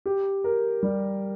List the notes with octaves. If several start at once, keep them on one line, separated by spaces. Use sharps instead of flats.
G4
A#4
G3